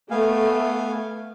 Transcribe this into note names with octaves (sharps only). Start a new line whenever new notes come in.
A3 B3 F5 G#5